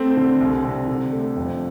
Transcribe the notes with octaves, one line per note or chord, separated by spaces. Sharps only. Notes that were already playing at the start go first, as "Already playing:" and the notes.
Already playing: A3 C4
D3
C2
C3
D3
A3
F2